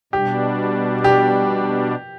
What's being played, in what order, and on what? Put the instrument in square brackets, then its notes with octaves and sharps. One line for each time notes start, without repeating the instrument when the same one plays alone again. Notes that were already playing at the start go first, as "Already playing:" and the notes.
[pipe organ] B2 G3 D4 [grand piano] G4
[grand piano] G4